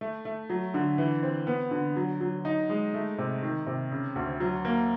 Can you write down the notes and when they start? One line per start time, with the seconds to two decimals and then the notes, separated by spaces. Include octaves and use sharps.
0.01 A3
0.25 A3
0.50 F#3
0.74 D3
0.98 E3
1.23 C4
1.47 B3
1.71 D3
1.96 F#3
2.21 F#3
2.45 D#4
2.69 G#3
2.94 A3
3.18 C3
3.42 D#3
3.66 C3
3.91 C#3
4.16 D2
4.40 F#3
4.65 A#3